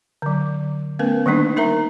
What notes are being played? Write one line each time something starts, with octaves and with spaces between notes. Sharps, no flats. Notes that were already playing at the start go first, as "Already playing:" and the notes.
D3 F#3
A3 B3 C#4 A#4 B4
D#3 G3 A#3 D4 D#4
D#4 A#4 E5 A#5